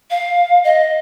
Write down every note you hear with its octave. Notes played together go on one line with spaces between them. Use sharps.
F5
D#5